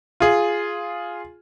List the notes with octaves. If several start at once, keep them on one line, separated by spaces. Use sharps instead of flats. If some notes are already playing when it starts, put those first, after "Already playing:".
F4 G#4